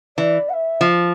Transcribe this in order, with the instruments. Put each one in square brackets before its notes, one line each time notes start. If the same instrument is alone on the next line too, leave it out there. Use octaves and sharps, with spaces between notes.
[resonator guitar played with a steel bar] E3 [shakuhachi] D5
[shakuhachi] F#5
E5
[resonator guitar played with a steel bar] F3